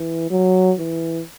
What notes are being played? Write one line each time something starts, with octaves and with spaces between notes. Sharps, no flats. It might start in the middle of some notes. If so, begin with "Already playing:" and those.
Already playing: E3
F#3
E3